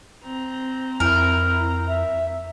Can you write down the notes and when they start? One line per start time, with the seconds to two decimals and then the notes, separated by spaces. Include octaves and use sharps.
0.23 C4 A#5
1.00 F2 E4 A#4
1.88 E5